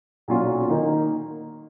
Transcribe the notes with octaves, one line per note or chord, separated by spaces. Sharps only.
B1 A#2 F#3 C#4 F4
D#3 A#3 D#4